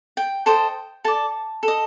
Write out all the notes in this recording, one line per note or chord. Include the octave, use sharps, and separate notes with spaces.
G5
A4 C5 D#5 G5
A4 D5 A5
A4
D#5